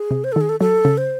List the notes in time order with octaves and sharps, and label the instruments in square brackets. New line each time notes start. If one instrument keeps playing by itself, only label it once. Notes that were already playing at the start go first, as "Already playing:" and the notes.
Already playing: [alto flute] G#4
[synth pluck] C3
[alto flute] C5
A4
[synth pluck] D#3 [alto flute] G#4
[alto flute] A4
[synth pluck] F#3 [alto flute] A4
[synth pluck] C#3
[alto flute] C5